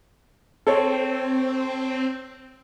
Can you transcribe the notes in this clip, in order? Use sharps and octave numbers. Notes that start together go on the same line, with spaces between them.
C4 A4 C#5